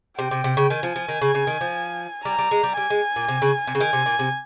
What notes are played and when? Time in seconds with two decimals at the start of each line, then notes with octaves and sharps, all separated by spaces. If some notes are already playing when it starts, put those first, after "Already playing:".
0.18 C3 G5
0.31 C3
0.44 C3
0.57 C#3
0.70 D#3 G#5
0.83 F3
0.96 F3
1.09 D#3
1.22 C#3
1.35 C#3
1.47 D#3
1.61 F3
2.25 G3 A#5
2.39 G3
2.51 G#3
2.63 G3
2.77 G3 G#5
2.90 G#3
3.16 A#2
3.28 C3
3.42 C#3
3.67 C3
3.75 C#3
3.80 D#3 G#5
3.93 C3
4.06 A#2
4.19 C3